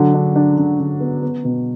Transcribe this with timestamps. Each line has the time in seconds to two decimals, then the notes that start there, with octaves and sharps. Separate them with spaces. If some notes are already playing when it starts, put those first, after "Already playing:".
Already playing: D3 F#3
0.14 D4
0.36 D4
0.58 D3
0.80 D3
1.00 B3
1.22 B3
1.44 B2